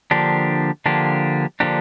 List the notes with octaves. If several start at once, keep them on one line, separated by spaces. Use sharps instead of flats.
D3 F3 A#3 D4 G4
D3 F3 A#3 D4 G4
D3 F3 A#3 D4 G4